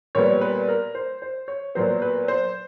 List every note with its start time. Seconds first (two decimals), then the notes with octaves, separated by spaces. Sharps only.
0.15 A#2 G3 B3 C#5
0.41 B4
0.68 A#4
0.95 C5
1.22 C5
1.48 C#5
1.75 A#2 F#3 B3 C5
2.02 B4
2.28 C5